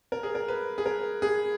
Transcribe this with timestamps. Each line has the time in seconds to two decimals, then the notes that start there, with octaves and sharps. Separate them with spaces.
0.12 A#4
0.23 G#4
0.35 A#4
0.48 B4
0.78 G#4
0.86 A#4
1.22 G#4